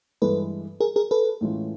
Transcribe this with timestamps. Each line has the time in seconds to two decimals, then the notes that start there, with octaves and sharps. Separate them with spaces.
0.22 G2 E3 G#3 A4 B4
0.81 G#4 A#4
0.96 G#4 A#4
1.11 A4 B4
1.41 A2 E3 G#3 C#4 F4